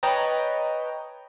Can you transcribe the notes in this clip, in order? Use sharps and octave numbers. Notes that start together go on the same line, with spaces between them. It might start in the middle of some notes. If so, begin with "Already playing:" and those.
B4 C#5 D#5 G5 A5 A#5